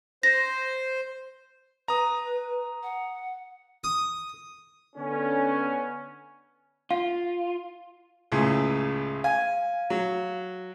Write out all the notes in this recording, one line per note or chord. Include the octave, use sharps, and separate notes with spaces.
C5 A#6
B4 A#5 D#6
F#5
D#6
D3 B3 C#4
F4 F5
C#2 A2 C#3
F5 G#5
F#3